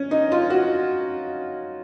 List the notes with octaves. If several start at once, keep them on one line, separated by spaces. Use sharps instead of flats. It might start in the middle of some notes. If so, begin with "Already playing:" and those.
Already playing: C#4
D#4
F4
F#4